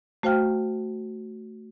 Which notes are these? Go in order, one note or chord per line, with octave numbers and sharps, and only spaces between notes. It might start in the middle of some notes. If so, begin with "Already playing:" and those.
A3 F#4 C5 F5 G5 F6